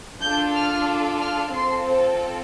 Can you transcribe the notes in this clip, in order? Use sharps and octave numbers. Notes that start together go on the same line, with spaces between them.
D4 F4 A4 G6
F6
F6
C4 F4 A4 C6
C5